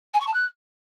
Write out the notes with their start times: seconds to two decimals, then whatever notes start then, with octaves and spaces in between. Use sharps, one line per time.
0.13 G#5
0.20 C#6
0.27 A5
0.33 F#6